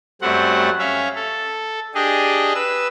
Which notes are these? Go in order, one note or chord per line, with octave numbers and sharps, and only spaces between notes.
F#2 G3 A3 C4 F#5
C#4 E5 F5
A4
D4 G4 G#4 D#5
B4 E6